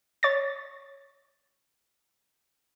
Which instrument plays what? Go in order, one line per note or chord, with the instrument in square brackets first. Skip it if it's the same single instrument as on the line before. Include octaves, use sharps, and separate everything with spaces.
[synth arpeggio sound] C#5 A6